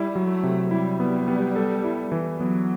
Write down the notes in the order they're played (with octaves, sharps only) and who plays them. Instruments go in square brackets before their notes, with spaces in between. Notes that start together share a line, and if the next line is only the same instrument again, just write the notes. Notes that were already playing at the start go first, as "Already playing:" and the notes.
Already playing: [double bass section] G3 [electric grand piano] E4
[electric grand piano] F#3
[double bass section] A3
[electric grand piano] C3
[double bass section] G3 [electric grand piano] E4
[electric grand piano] B3
B3
A4
E4
E3
[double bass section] F#3 [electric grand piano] B3